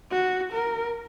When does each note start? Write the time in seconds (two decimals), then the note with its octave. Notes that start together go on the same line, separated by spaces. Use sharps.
0.11 F#4
0.53 A#4